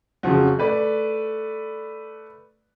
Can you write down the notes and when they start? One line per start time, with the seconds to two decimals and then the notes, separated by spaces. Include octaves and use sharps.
0.23 F2 C#3 F3 F#3
0.59 A3 B4 D5